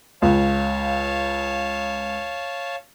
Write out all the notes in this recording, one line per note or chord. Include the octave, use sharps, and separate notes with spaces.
C#2 C#5 F5 A5